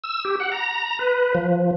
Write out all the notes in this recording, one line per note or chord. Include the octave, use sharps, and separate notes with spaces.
E6
G4
F#5
A#5
B4
F3